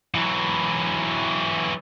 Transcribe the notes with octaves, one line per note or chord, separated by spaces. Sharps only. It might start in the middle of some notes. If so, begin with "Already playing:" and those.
E3 F#3